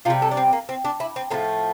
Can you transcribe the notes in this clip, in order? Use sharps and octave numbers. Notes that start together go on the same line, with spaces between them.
C3 G3 F4
A4
D4
C4
A#3
C4
D4
E4
C4
A2 F3 A3 A#3